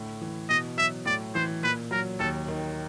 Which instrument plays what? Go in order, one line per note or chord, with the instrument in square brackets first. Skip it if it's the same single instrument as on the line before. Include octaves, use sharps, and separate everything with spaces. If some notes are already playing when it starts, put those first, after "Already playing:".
Already playing: [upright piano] A2 D3
E3
[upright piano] B2 [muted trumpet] D#5
[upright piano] F#3 [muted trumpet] E5
[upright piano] A2 [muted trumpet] D5
[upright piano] E3 [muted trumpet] C5
[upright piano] A#2 [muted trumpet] B4
[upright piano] F#3 [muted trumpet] A#4
[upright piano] D#2 [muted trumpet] A4
[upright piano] D#3